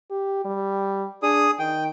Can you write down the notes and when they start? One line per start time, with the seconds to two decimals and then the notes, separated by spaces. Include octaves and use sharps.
0.11 G4
0.45 G3
1.23 D4 G#4 D#6
1.59 D#3 G5